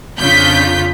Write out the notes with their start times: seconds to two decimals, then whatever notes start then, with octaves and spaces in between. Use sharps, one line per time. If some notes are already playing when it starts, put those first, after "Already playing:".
0.19 F2 C#3 D4 F4 G6 B6